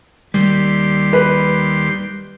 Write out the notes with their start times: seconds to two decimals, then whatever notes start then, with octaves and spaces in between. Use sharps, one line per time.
0.34 D#2 G3 G4 C6
1.13 B4